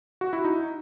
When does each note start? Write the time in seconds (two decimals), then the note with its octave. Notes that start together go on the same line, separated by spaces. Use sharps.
0.21 F#4
0.33 E4
0.45 D#4